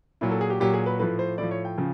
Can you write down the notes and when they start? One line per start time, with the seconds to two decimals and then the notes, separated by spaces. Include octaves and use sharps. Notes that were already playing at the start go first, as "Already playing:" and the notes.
0.21 A#2 F#3 E4
0.31 A4
0.41 G#4
0.50 G4
0.60 A#2 F#3 G4
0.74 G#4
0.86 B4
0.99 A2 F3 B4
1.19 C5
1.38 A2 F3 D5
1.51 C#5
1.65 G5
1.78 C#3 F3